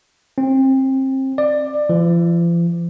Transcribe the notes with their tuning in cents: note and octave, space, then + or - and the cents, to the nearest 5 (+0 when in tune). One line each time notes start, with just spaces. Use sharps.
C4 +30
D5 +20
F3 -45